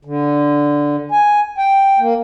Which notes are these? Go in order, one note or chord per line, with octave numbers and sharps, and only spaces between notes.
D3
G#5
G5
A#3